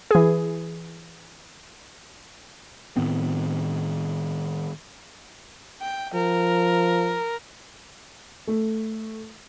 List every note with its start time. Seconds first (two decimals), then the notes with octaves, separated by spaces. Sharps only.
0.11 E3 G#4
2.97 A2 D#3 B3 C4
5.82 G5
6.14 F3 A#4
8.48 A3